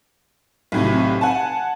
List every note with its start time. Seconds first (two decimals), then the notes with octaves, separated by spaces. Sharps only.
0.72 B1 A2 C3
1.21 F#5 G#5 A5